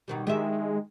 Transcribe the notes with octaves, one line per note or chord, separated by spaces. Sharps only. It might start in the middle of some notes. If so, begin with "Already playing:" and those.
B2 D#3 G3
D#3 G#3 G4 E5